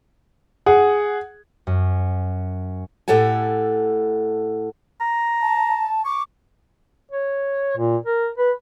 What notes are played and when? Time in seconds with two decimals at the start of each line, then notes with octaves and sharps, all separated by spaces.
0.66 G#4 F#5
1.67 F#2
3.08 A2 G4 A4 F#5 G#5
5.01 A#5
5.41 A5
6.05 C#6 D6
7.11 C#5
7.77 A#2
8.06 A#4
8.38 B4